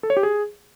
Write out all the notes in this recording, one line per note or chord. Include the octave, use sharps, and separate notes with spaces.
A4
C#5
G4
G#4